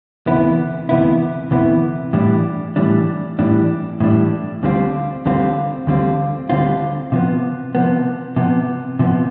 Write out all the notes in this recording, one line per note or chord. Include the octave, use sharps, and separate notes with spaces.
D2 C3 E3 B3 E4
D2 C3 E3 B3 E4
D2 C3 E3 B3 E4
A2 E3 G3 D4
A2 E3 G3 D4
A2 E3 G3 D4
A2 E3 G3 D4
D2 D3 G3 C4 F4
D2 D3 G3 C4 F4
D2 D3 G3 C4 F4
D2 D3 G3 C4 F4
C3 F3 B3
C3 F3 B3
C3 F3 B3
C3 F3 B3